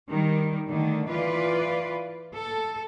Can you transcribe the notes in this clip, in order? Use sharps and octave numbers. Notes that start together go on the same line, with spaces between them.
D#3 G3
D3 D#3 A3
E3 F4 B4 D5
A4